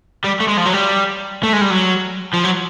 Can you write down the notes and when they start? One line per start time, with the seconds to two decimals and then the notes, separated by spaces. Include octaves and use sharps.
0.24 G3
0.40 A3
0.48 G#3
0.57 F3
0.65 F#3
0.73 G3
1.43 A3
1.53 G#3
1.61 G3
1.70 F#3
2.34 F3
2.44 F#3